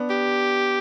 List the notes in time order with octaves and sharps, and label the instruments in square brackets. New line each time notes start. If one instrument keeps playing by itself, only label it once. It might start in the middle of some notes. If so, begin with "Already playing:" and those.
Already playing: [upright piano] B3 D4
[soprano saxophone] G4